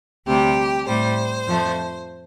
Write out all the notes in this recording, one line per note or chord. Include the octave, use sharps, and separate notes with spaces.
D2 C3 G3 G4
A2 G3 C5
F2 F3 A3